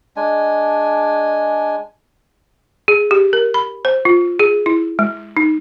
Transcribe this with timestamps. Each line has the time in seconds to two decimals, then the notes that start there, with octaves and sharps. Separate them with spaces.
0.16 G#3 D4 G#5
2.88 G#4
3.11 G4
3.33 A#4
3.54 B5
3.85 C5
4.05 F4
4.39 G#4
4.66 E4
4.99 G#3
5.37 D#4